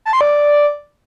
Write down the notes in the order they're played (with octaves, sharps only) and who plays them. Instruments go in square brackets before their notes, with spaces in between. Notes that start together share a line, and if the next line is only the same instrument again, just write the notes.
[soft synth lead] A5
C6
D5